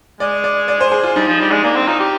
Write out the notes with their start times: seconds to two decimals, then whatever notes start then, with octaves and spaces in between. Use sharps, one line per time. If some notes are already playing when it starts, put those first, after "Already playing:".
0.20 G#3 D5
0.44 D5
0.68 D5
0.81 C5
0.92 G#4
1.03 F4
1.16 G3 D#4
1.28 F3
1.40 G3 D4
1.51 G#3
1.64 A#3 D4
1.75 C4
1.87 D#4 F4
2.00 G4